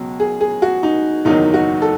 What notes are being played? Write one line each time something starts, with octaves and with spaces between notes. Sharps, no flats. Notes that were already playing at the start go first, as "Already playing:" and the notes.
Already playing: C#2 B2 F#3
G#4
G#4
F#4
D#4
F#1 E2 D#3 F#3 D#4
F#4
A4